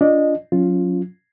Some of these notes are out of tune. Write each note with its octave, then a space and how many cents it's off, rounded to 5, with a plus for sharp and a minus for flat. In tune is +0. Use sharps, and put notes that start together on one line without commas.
D4 -20 F4 +0 D#5 -15
F#3 -30 C#4 +0 F4 +0